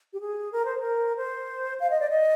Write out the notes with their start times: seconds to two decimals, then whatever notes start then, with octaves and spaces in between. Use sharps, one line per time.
0.13 G4
0.21 G#4
0.52 A#4
0.65 C5
0.80 A#4
1.17 C5
1.80 F5
1.90 D#5
2.00 D5
2.10 D#5